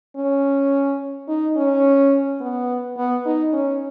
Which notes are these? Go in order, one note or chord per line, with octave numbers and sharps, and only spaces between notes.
C#4
D#4
C#4
B3
B3
D#4
C#4